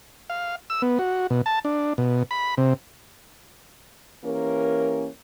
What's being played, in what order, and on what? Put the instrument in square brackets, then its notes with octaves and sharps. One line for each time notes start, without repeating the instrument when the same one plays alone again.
[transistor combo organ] F5
E6
B3
F#4
B2
A5
D4
B2
B5
C3
[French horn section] E3 A#3 C#4 G4 A#4